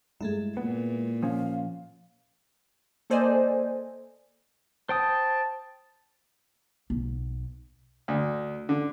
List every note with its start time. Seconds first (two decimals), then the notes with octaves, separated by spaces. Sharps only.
0.20 G2 G#3 A3 E4
0.57 A#2 B3
1.23 F3 C#4 F5
3.10 A#3 A4 C5 D5 D#5 G#5
4.89 C5 G5 A5 D#6
6.90 B1
8.08 D2
8.69 D3